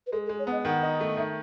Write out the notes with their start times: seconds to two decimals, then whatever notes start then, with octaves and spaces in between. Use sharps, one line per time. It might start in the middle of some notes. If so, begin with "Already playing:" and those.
0.07 B4
0.12 G#3 A4
0.26 A4
0.29 G#3
0.39 C#5
0.47 B3
0.52 D#5
0.65 D#3 F#5
0.83 D#4
1.00 A3
1.17 D#3 E5